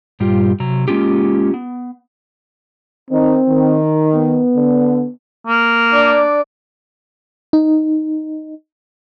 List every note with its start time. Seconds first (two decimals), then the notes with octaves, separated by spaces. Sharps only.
0.20 G2 A#2 G3 F4 G4
0.60 C3 F#3 A#5
0.88 G#3 A#3 C#4 F4 G4
1.54 B3
3.10 D#3 C4 D#4
3.47 D#3
4.14 B3
4.55 D3
5.47 A#3
5.91 D4 D5
7.53 D#4